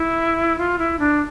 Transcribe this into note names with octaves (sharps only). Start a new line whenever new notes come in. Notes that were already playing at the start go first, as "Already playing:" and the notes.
Already playing: E4
F4
E4
D4